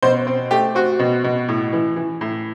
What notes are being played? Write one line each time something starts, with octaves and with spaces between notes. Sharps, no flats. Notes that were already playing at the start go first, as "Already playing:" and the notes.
B2 C5
C4
A3 G4
C4 F#4
B2
B2
A2
E3
E3
A2